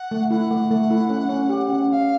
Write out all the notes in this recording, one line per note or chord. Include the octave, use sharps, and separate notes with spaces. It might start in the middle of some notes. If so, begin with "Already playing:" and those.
Already playing: F#5
A3
E4 F#5
A3
A3
E4
C#4
C#4
G4
C#4
C#4 F5 F#5